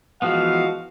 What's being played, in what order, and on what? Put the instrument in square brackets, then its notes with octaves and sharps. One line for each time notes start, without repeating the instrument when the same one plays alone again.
[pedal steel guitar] E3 F3 B3 [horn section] G#3 F#4 F5